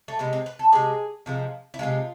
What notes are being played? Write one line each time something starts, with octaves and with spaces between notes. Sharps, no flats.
A3
C3 G#3 B3
C4
B4
A4
C3 G#3 G#4
C3 F3 G#3
E4
C3 F3 G#3 F4